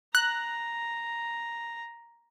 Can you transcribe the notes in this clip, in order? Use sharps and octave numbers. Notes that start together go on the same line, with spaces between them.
A#5 F#6